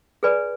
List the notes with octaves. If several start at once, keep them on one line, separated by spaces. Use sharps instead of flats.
G#4 B4 D5 G#5 B5